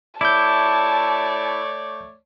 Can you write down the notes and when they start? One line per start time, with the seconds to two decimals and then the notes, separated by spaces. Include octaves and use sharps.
0.21 A3 E4 C#5 D5 A5 D6 G6